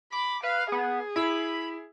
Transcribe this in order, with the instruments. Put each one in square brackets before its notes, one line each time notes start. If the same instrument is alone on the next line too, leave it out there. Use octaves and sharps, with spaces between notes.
[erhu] B5 [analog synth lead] D6
[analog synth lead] B4 [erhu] F5
[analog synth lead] B3 [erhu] G#4
[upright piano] E4 [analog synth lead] B5